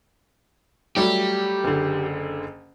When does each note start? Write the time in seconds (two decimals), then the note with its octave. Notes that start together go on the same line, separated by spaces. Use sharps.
0.96 F#3 G3 A3 G4
1.64 F#1 D3